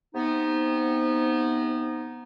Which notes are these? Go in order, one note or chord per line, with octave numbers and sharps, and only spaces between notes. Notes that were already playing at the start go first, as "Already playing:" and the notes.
C3 B3 D#4